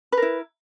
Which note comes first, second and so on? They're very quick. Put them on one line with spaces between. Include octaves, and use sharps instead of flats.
B4 A#4 E4